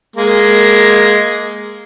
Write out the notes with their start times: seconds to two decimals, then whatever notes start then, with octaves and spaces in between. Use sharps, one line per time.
0.16 G#3 A#3